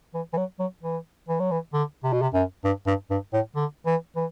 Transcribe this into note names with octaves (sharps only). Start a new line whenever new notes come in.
E3
E3
F#3
F#3
E3
E3
F#3
E3
D3
C3
B2
C3
F#2
G2
G2
G2
A2
D3
E3
E3